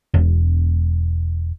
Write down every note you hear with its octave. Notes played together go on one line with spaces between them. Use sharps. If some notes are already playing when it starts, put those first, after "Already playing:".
E1